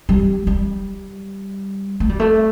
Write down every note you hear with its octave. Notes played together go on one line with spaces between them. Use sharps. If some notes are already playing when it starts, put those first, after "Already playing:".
G3
G3
A3
G3
A3